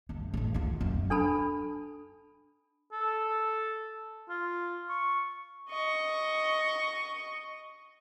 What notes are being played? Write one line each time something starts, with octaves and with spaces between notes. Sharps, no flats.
G1 D3
D2 A2
B3 F4
F#2 F#3
D4 A4 A5 B5
A4
F4
C#6
D#5 C#6